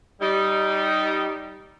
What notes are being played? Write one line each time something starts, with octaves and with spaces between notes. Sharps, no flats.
G3 D#4